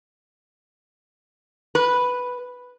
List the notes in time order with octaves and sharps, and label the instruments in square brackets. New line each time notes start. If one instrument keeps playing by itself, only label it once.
[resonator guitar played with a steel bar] B4